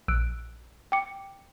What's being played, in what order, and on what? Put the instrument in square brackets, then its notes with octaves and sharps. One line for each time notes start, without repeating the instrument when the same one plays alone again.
[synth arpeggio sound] A#1 F#6 D7 [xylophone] E6
[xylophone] G5 D6 C#7